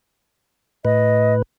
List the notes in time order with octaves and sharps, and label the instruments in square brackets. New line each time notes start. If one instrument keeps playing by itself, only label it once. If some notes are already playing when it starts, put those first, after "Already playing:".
[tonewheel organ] A2 B4 [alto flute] D#5